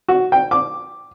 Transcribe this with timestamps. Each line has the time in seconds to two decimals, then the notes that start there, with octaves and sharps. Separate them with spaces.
0.08 F#4
0.32 G5
0.51 D6